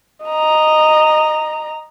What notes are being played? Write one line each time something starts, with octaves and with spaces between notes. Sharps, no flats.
D#5 A#5